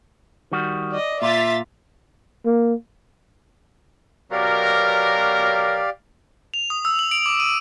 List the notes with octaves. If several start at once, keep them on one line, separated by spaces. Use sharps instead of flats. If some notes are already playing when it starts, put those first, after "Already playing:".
D#3 G3 F#4
D5 D#5
A#2 F4 E5 A6 B6
A#3
B2 F#3 G4 A#4 D5 F5
F7
D#6
E6
F#7
D7
D6
D#7